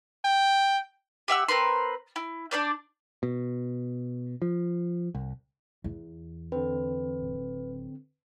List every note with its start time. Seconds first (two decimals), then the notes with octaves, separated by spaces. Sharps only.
0.25 G5
1.28 G4 E5 F#5 E6
1.48 C4 A#4 B4 C6
2.16 E4
2.51 D4 C5 D5 G6
3.23 B2
4.42 F3
5.15 C2
5.84 E2
6.52 D3 C4 B4
7.20 D1